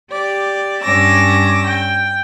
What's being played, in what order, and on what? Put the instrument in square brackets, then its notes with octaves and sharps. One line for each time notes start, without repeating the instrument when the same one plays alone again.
[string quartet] G4 D5
G2 C#4 D6 E6 A#6
G5